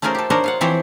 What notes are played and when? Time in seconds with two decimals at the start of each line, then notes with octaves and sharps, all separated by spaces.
0.02 A3 C#4 F4 G#4 A#4 C5
0.15 G4 A4
0.30 D4 A#4 C5 C#5 D#5
0.44 F4 F5 F#5
0.61 E3 F3 C4 G4 C5 C#5